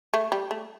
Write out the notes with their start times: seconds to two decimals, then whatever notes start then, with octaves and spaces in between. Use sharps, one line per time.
0.14 A3
0.32 G3
0.51 A3